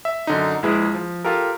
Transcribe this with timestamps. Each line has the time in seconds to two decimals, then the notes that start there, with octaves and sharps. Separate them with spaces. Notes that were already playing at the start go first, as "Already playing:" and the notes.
0.05 E5
0.27 F#2 D3 D#4
0.63 A#1 G#3 E4 G#4 B4
0.95 F3
1.25 F4 G4 A4 A#4